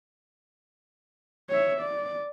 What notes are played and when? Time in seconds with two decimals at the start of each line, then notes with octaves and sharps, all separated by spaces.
1.50 C#5 E5
1.81 D5